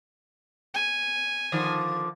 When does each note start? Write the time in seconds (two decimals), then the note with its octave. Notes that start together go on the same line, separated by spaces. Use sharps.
0.74 G#5
1.52 D3 D#3 F3